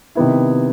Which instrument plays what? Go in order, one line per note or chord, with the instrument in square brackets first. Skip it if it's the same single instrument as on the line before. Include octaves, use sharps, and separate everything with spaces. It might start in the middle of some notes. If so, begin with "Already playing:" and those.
[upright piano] C3 D#3 G3 B3 E4